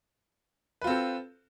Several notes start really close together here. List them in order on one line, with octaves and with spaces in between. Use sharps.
B4 F4 C4 A4